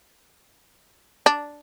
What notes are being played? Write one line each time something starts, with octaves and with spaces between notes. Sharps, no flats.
D4